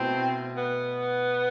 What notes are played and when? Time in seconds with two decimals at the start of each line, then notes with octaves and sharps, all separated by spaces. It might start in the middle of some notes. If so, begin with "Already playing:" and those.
Already playing: B2 A3 C4 E4
0.57 B3